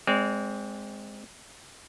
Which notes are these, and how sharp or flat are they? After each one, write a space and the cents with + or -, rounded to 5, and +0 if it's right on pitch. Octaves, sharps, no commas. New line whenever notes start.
G#3 +0 C4 +0 D5 -35